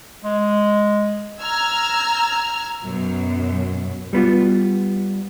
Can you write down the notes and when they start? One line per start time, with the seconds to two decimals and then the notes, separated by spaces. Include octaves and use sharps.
0.25 G#3
1.40 A#5 E6 F6 G#6
2.85 F#2 B2
4.13 G3 B3 F4 F#4